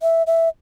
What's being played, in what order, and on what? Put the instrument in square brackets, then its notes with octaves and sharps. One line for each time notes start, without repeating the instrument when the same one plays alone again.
[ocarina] E5
E5